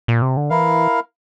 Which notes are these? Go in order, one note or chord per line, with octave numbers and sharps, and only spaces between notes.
A#2
C3
D3
E3 E4 A#4 F5